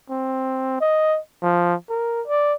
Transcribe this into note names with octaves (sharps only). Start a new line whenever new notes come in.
C4
D#5
F3
A#4
D5